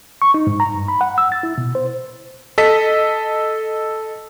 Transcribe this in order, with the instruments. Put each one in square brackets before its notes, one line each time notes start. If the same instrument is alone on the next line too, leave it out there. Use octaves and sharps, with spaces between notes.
[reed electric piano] C#6
D#4
G#2
A#5
G2
B5
F#5
E6
A6
E4
B2
C5
[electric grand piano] A4 D#5 B6